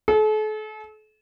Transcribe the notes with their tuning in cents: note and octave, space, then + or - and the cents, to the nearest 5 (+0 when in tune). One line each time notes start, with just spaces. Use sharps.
A4 -40